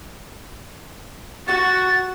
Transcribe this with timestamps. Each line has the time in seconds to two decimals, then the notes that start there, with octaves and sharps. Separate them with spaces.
1.48 F#4 A6